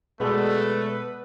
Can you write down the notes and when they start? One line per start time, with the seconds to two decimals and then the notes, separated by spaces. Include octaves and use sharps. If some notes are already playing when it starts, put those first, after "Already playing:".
0.20 B2 G#3 A3 B3 A4 B4 D5